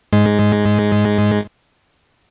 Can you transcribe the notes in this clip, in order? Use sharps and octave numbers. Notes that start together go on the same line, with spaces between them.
G#2 G#3